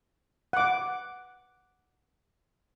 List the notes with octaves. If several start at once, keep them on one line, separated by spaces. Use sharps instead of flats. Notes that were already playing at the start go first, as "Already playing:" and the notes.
F#5 D6